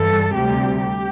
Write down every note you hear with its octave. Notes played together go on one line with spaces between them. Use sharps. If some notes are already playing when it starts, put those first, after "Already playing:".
Already playing: G2 E3 G3 A4
D2 C3 G3 G4
G4